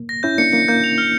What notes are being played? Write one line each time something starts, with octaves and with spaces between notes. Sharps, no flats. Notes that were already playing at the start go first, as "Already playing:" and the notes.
Already playing: A#3
A#6
C#4 E4 G6
A#3 D4 C#7
A#3 C#7
A#3 G6
F7
F6